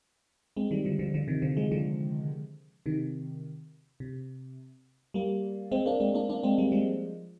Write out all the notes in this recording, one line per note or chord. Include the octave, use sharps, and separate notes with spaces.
G#3 C4
D#3 G3
D3 F3
D3 F3
D3 F3
C3 D#3
D3 F3
F3 G#3
D3 F3
C3 D#3
C3
G3 A#3
G#3 C4
A#3 D4
G#3 C4
A#3 D4
A#3 D4
G#3 C4
G3 A#3
F3 G#3